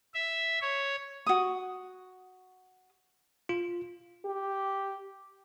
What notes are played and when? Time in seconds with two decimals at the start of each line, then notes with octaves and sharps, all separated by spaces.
0.14 E5
0.62 C#5
1.27 F#4 D#6
3.49 F4
4.25 G4